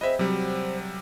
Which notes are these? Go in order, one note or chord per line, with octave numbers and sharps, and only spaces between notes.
C4 G#4 B4 C5 D#5 E5
C3 F#3 G3 C5